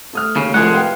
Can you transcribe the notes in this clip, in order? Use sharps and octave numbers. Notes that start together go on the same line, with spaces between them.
A3 D#6 F6
D#2 C#3
C2 F3 G#3 A3 G#4 F#5
B4 F5 G5